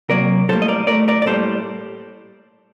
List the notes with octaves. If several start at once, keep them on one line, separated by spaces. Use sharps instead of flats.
C3 F#3 A#3 A#4 D5
A2 G3 A#3 A4 C5
D#5
A#4 D5
A2 A3 A#4 D5
A#4 D5
D5
A2 G3 A#3 A4 C5